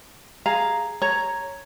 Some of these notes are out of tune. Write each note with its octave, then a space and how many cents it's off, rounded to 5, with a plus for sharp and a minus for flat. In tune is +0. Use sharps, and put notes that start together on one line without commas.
G#4 +0 F5 +0 A#5 +0
A4 +25 C#5 +0 A#5 +0